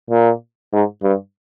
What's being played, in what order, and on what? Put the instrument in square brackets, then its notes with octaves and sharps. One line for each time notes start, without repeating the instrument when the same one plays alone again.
[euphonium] A#2
G#2
G2